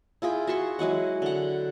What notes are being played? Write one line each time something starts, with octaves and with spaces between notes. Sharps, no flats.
E4 F4 G#4 G5
F#4 E5 C6 C#6
F#3 G#3 E4 F#5
D3 F#5